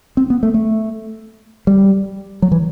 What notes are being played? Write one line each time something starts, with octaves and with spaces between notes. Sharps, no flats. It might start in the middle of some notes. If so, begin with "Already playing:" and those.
C4
B3
A3
A3
G3
F#3
E3